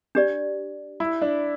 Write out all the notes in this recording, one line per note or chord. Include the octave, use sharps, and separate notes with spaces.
D4 G4 D5
E4
D4